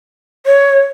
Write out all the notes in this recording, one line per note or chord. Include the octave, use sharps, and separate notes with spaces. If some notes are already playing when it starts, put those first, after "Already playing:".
C#5